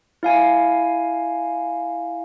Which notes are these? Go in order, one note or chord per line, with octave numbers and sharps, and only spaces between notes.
E4 F5 G#5